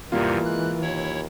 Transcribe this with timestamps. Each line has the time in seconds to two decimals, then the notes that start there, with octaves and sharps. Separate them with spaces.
0.12 E2 G#2 C3 E3 G3 A#3 F4
0.45 G#3 F#6
0.81 D#2 E4 C#5